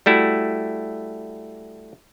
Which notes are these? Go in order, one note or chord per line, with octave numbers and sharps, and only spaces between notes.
G3 A3 E4 F#4